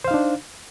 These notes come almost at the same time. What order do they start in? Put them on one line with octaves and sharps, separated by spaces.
C5 F5 D#4 D4